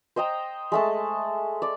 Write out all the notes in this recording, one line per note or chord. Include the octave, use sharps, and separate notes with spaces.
C5 D#5 G5 A#5
G#3 A3 A5
D5